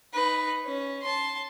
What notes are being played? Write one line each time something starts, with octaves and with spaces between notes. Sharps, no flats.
D#4 B4
C#4
A5 C6